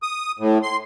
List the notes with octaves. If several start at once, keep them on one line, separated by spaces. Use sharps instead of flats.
D#6
A2
C6